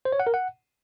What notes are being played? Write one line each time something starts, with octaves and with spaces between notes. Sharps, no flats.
C5
C#5
F#5
A#4
F#5